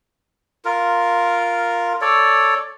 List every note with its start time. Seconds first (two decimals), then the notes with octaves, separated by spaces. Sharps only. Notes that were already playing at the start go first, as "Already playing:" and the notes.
0.65 F4 A#4
2.01 A4 C#5 D5